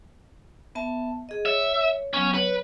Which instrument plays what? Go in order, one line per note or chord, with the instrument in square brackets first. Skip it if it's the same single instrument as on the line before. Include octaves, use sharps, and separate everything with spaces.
[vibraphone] B3 E5 A5
G#4 D#5
[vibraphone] C#5 [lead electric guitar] E5
[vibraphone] F#3 B3 [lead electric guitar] C#4
[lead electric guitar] B4 [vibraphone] C#5